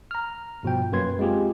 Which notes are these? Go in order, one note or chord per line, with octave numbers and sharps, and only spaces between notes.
A#5 F6
G2 B2 F3 G5
F#2 F#3 A#3 B4 C6 G#6
G#3 C4 F4 G4 G#4